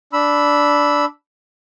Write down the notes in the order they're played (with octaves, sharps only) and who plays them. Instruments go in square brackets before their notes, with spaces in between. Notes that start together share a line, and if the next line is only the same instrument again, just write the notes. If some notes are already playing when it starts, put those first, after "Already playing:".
[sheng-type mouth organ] D4 B5 E6